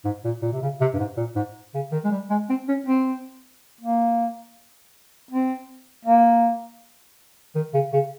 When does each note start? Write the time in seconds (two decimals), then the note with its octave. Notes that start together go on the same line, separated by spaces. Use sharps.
0.05 G#2
0.24 A#2
0.42 A#2
0.52 C3
0.62 C#3
0.81 C3
0.93 G2
0.99 G#2
1.17 A#2
1.36 G#2
1.74 C#3
1.92 D#3
2.04 G#3
2.11 G3
2.30 G#3
2.49 C4
2.68 C#4
2.87 C4
3.81 A#3
5.31 C4
6.05 A#3
7.55 D#3
7.74 C#3
7.93 C#3